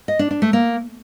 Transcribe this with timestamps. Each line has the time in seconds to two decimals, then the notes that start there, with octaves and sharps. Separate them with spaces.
0.08 D#5
0.19 D4
0.31 D4
0.42 A3
0.53 A#3